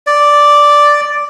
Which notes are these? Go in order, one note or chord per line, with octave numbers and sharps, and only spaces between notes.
D5